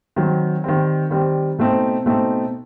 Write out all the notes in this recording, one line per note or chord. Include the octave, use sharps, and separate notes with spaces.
D#3 F#3 C4
D#3 G3 C4
D#3 G3 C4
B2 A3 C4 D#4
B2 A3 C4 D#4